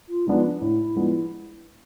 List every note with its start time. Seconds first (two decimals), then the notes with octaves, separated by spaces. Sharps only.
0.09 F4
0.27 F3 G#3 B3 D4 D#4
0.44 D4
0.61 A2 E4
0.96 F3 G#3 B3 D4